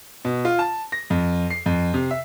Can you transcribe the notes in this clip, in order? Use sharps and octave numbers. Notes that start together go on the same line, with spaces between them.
B2
F4
A5
A#6
F2
C7
F2
C3
E5